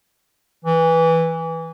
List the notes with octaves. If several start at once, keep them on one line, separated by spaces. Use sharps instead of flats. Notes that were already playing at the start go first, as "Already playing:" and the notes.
E3